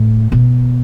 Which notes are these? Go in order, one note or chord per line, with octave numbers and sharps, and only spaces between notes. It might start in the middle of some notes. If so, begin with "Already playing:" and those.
Already playing: A2
B2